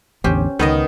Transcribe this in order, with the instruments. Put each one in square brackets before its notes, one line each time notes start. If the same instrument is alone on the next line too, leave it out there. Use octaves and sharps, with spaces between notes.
[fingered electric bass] A1 E2 D3 [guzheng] C#4 G4 C5
[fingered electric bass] C#2 [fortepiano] D#3 [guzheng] B3 A#4 D#5